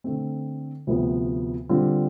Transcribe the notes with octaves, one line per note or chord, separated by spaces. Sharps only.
D3 A3 C4
D2 C3 F3 B3
D3 G3 C4 F4